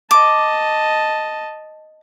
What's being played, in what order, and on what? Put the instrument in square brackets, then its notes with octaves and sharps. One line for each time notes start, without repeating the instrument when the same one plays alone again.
[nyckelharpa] D#5 A5 [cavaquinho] D6